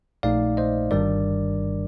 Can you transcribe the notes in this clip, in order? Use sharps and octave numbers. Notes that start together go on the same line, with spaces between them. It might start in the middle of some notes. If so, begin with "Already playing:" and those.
A#1 A#2 A3 D#4 D5 F5
C5 D#5
G1 G2 D#3 G3 D4 A#4 D5